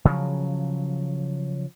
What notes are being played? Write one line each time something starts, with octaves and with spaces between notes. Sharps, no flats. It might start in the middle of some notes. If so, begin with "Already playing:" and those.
C#3 F3 F#3